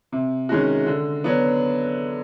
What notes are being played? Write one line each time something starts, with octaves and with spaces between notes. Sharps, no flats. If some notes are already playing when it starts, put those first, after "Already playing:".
C3
D#3 G#3 C#4 F#4
D3
F#3 B3 D4